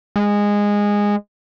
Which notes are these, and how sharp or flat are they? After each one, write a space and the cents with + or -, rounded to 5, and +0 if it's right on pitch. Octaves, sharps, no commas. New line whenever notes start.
G#3 -15